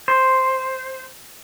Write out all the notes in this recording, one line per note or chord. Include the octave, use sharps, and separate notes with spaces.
C5